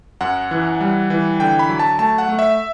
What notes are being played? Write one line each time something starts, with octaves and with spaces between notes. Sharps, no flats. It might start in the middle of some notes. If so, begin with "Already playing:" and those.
F#2 F#5
E3
G3
E3
D3 G5
B5
F#3
A5
A3 A5
F#5
A3
E5